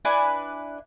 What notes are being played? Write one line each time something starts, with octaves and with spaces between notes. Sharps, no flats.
D4 E4 B4 G#5